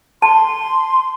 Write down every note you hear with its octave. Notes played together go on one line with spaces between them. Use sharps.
A5 C6